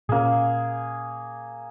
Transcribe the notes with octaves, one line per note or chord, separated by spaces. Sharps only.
A#2 A#3 C#4 G#4